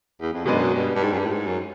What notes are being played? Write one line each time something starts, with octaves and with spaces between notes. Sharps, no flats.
E2
F2
F#2 B2 G#3 B3 D4
G2
G2
G#2
F#2
G2
A2
G#2
F#2